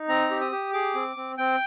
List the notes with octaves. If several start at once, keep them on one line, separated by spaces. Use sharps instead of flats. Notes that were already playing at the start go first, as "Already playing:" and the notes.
Already playing: D#4
C4 A#5
G4
D#6
G4
G#4 D6
C4
C4
C4 G5